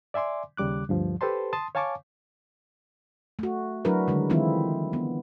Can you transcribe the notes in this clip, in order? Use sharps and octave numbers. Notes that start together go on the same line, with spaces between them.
D5 E5 G#5 C6 D6
D#2 C#3 G3 D6 F#6
D2 G2 F3
G4 A4 B4 C5 A5 C6
A5 C6 D#6
C#5 F5 G#5 A5 C#6 D6
A3 F#4
F#3 D4 E4 F#4 A#4 B4
D3 D#3 G#3
D#3 E3 G#3 C4 E4 F4
B3